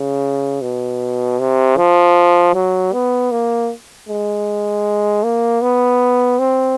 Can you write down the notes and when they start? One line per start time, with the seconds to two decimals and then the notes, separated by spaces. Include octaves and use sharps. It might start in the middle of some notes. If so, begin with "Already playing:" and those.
Already playing: C#3
0.62 B2
1.39 C3
1.77 F3
2.55 F#3
2.93 B3
3.31 A#3
4.09 G#3
5.24 A#3
5.62 B3
6.39 C4